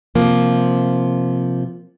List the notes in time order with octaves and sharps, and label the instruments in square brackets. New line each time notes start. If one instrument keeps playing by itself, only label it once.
[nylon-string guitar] C3 F3 A#3